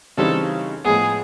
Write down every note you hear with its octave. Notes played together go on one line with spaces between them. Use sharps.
C#3 E3 G3 C4 D#4 A4
A2 F3 G#3 B3 G#4